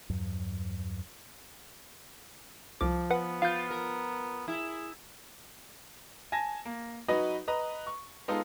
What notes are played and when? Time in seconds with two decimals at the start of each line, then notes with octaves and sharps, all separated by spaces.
0.10 E2 G2 F#3
2.81 C2 F3 D6
3.10 B3 B4 F#5
3.42 F4 F5 G6
3.70 A#4
4.48 E4 G#4
6.32 G#5 A5 A#6
6.65 A#3
7.08 F#3 D#4 F#4 B4 D#5
7.48 B4 D#5 A#5
7.87 C#6
8.28 G#3 B3 D#4 F4 A4